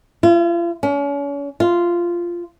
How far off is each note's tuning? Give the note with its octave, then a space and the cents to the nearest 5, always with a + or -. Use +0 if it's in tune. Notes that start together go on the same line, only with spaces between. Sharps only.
F4 -40
C#4 +40
F4 -10